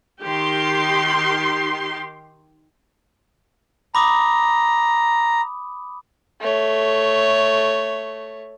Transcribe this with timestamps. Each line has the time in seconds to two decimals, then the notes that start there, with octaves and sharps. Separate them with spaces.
0.23 D#3 G4 C6
3.95 A#5 B5 D6 D#6
6.41 A3 C#5